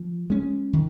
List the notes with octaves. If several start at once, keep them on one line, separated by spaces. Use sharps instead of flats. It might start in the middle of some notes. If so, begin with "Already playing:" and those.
Already playing: F3
G#3 C#4
D#3